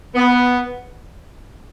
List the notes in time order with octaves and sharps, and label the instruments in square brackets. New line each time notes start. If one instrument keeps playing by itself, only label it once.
[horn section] B3